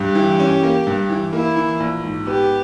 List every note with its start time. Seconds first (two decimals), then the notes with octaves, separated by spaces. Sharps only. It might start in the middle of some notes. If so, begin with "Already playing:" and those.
Already playing: G2 G4
0.15 E3
0.40 C#4
0.63 A#3
0.87 G2
1.10 E3
1.33 A#3 E4
1.56 E3
1.80 A#1
2.04 G#2
2.26 B3 G4